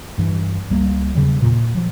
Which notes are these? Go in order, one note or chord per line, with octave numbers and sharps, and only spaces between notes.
G2 E3
C#2 G3 A#3
E2 C#3 F#3 G3
A#2
F3 F#3